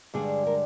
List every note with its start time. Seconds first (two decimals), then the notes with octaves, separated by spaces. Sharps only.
0.14 G2 D3 G#3 D4 G#4
0.47 A#4